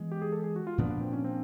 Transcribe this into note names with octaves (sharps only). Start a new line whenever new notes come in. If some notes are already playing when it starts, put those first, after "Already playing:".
Already playing: E3 G#3 B3
G4
G#4
A4
G#4
F#4
F4
A#2 F3 A#3 B3 D4
B3
C4
C#4
C4